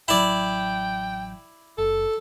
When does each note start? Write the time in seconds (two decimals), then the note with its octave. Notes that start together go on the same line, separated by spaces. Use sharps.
0.08 A1 F#3 E4 D5 G5
1.78 F#1 A4